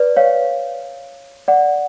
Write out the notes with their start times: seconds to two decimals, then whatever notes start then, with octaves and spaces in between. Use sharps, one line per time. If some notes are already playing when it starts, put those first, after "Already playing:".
Already playing: B4 D5
0.16 C#5 F5
1.48 D5 F#5